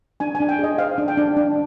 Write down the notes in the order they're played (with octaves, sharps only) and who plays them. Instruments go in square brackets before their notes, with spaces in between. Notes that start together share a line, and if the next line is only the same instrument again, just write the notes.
[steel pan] D4 G#5
G#5
D4
G5
G#4 D#5
C5 F5
D4
G5
D4
D4